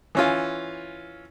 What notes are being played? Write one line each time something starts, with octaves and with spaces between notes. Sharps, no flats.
E3 C#4 F4